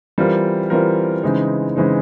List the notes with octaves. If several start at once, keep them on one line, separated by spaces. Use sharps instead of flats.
E3 G3 C4 F4 A#4
E3 G3 C4 F4 A#4
C#3 E3 G#3 C4 D#4
C#3 E3 G#3 C4 D#4